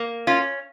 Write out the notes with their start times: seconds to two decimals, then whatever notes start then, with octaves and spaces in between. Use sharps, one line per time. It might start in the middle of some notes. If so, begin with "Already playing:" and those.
Already playing: A#3
0.27 C#4 F4